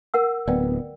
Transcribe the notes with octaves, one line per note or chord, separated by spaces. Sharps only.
A#4 F#5 E6
D1 B3 D5 G5